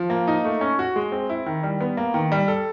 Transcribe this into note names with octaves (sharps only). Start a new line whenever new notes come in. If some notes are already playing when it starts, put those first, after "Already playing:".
Already playing: F3
A#3
D#4
A3
C#4
F#4
G#3
C4
E4
D#3
G3
B3
A#3
D#3
G3
A4